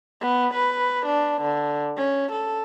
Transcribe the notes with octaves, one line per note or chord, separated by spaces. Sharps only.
B3
B4
D4
D3
C#4
A4